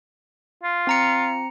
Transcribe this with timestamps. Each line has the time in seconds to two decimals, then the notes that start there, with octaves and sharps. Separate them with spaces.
0.63 F4
0.87 C4 A#5 C#7